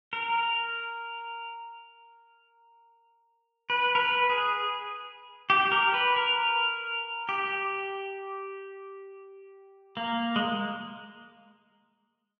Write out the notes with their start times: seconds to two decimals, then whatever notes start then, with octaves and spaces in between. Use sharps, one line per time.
0.13 A#4
3.70 B4
3.95 A#4
4.00 B4
4.30 G#4
5.50 G4
5.72 A#4
5.94 B4
6.16 A#4
7.29 G4
9.97 A#3
10.36 G#3